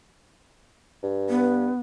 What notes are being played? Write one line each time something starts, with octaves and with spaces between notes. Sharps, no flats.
G2
B3